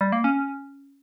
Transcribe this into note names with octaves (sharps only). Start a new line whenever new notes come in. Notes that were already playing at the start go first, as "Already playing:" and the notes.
G3
A#3
C#4